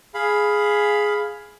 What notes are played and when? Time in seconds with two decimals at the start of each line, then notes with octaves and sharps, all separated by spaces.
0.14 G#4 F5 B5